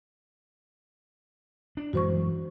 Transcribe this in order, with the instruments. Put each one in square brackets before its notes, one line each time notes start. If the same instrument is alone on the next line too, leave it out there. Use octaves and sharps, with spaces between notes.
[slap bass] D4
[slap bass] F#2 E3 G#3 [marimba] F#4 C5 C#6